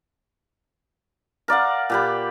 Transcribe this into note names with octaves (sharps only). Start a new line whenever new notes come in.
A#4 D5 F5 F#5
A#2 G4 B5